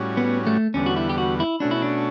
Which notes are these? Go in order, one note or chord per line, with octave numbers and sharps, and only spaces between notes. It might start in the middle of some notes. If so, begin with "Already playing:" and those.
Already playing: A2 G3 C#4 F#4
B3
A3
E2 D3 G3 B3 C#4
F#4
E4
G4
F#4
E4
B2 A3 C#4 D4 F#4
E4
D4